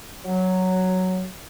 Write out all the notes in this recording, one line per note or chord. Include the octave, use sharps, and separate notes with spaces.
F#3